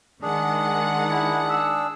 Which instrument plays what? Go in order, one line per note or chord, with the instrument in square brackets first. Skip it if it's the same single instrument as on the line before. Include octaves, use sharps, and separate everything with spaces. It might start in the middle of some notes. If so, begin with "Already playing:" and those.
[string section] D#3 G#3 F#5 [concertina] D4 G#4
[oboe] E4
E6